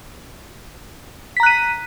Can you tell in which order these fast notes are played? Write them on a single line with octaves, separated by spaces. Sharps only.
B6 A#5 F#6 D#7